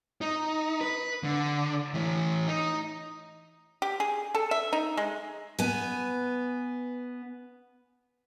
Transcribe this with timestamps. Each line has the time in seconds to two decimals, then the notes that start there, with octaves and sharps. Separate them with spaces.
0.21 D#4
0.81 B4
1.24 D3
1.94 E3 A3
2.48 D#4
3.82 G4
4.00 G#4
4.35 A4
4.51 E5
4.73 D#4
4.97 G#3
5.59 B3 G#5